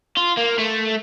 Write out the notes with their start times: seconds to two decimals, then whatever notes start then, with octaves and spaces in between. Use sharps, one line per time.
0.17 F4
0.37 A#3
0.58 A3